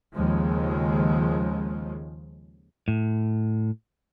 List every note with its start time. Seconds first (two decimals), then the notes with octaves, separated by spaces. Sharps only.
0.15 D#2 C#3 F3 G#3
2.88 A2